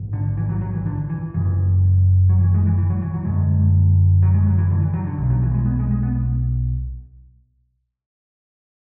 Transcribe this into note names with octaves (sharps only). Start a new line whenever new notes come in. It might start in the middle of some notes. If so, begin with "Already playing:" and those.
Already playing: A1 G#2
D3
E3
F#3
F#3
E3
D3
E3
F#1 F#2 C#3 E3
F#3
E3
G#3
E3
E3
F#3
E3
F#3
F#1 F#2 D3 G#3
F#3
G#3
F#3
E3
D3
E3
F#3
D3
B1 B2
F#3
E3
G#3
B3
G#3
G#3
B3